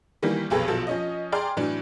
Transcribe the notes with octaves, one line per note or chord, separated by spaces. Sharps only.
D#3 E3 G3 A#3
F1 B1 G#4 A4 B4
A#1 B2 F3 F#3 A4
F3 C#4 D#5
G#4 D5 G5 A#5 C6 F6
A2 E3 F#3 D4